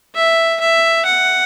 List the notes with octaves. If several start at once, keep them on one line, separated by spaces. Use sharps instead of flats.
E5
E5
F#5